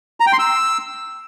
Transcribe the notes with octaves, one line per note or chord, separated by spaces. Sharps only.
A#5
G5
C6
E6